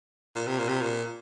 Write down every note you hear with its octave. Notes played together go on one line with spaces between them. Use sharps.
A#2
C3
A#2
C3
A#2